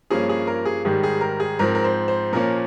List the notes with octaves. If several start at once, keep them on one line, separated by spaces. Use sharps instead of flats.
G2 F3 A#3 C#4 G#4
G#4
A#4
G#4
G#2 D#3 G3 G#4
G#4
A#4
G#4
G#2 F3 C4 A#4
A#4
C5
C5
A#2 F3 A#3 C#4 A#4